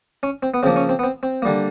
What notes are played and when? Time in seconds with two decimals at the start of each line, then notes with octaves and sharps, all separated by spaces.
0.23 C#4
0.43 C4
0.54 B3
0.63 C#3 F3 A#3 C4
0.76 C#4
0.89 C4
0.99 B3
1.03 C4
1.23 C4
1.42 D3 G3 A#3